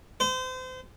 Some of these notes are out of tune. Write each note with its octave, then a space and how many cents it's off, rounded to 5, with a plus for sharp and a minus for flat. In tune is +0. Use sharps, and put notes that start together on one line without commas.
C5 -35